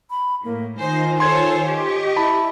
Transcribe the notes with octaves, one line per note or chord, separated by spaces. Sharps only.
B5
A2 A#3
D#3 D#4 F4 C5 G#5
A4 C5 C#5 C6 G#6
G4 D#5 C#6
E4 A5 B5